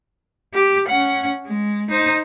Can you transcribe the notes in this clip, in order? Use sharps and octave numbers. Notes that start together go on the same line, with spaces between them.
G4
C#4 F#5
G#3
D#4 C5